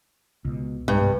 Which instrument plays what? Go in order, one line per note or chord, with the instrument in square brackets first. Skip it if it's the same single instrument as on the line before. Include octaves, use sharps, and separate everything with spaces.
[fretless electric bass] C#2 B2
[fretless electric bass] B1 G#3 B3 [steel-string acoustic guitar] G2
[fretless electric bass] C2 G#2